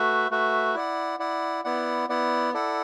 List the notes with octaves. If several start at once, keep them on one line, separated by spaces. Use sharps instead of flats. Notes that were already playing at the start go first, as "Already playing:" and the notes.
Already playing: A3 F#4 B4 E5
A3 F#4 B4 E5
E4 D5 F#5
E4 D5 F#5
B3 E4 D5 F#5
B3 E4 D5 F#5
E4 A4 D5 F#5